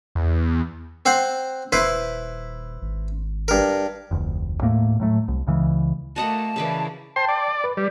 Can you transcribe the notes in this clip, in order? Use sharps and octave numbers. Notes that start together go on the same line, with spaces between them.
E2
C4 C5 F#5
D#1 E4 B4 C5
G#1
G2 A#4
F1 D2
D#2 A2 A3 A#3
A2 F#3 A3
C2
C#2 C#3 E3 G#3
A3 A#3 F#4 D#5 F#5 A5
C#3 E3 A#3 E4 B4 D5
C5 G5 A5 C6
D5
B4
G3 D5